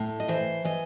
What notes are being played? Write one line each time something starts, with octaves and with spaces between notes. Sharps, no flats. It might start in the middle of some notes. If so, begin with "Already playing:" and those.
Already playing: A2
D#5
E3 C5
E3 D#5